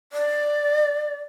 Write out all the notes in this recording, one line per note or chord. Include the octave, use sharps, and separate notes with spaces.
D5